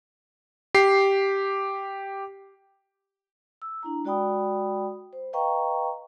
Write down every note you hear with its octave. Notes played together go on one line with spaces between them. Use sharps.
G4 C7
E6
D4 E4 A#5
G#3 F#4 D5 G5 B5 D#6
C5
B4 D#5 F5 G5 A#5 C#6